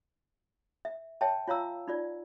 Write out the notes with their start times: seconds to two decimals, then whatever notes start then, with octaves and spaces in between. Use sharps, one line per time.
0.85 E5
1.21 C#5 E5 G5 A5
1.48 F4 C#5 F5 A#5 E6
1.88 D#4 F4 D5